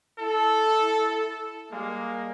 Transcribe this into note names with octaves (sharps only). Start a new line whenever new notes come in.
E4 A4
G3 G#3 A#3